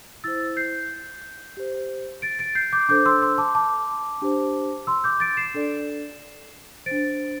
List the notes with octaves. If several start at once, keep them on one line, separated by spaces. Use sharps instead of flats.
E4 C5 E6 A6
G6 C7
G4 C5
A6 D7
A6 D7
G6 C7
D6 G6
D4 A4 C5 D6 G6
C6 E6
C6 E6
A5 D6
A5 D6
D4 G4 C5
C6 E6
D6 G6
A6 D7
C7 E7
D4 A4 D5
D4 C5 A6 D7